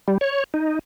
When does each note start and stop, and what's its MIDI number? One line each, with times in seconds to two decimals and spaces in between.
0.08 0.18 55
0.21 0.44 73
0.54 0.79 63